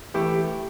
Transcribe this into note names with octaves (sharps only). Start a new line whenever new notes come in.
E3 A3 E4 G4